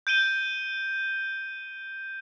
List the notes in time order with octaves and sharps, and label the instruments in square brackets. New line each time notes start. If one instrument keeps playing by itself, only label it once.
[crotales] G6 D7 D#7 G7